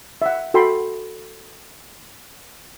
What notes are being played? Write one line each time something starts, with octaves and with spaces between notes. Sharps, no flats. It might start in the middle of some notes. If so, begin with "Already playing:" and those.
E5 F#5
F#4 A4 G5 B5 C6